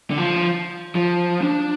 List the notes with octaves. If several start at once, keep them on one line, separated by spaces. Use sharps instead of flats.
D3
F3
F3
D4